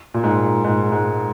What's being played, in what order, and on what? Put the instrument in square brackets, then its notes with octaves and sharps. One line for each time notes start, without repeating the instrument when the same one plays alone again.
[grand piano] A#2
G#2
G#2
G#2